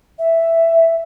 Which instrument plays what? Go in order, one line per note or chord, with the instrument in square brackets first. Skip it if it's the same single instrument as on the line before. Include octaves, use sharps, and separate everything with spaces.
[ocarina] E5